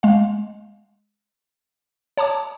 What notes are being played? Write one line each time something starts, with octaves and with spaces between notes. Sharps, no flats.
G#3 F5
C#5 A5 A#5 D6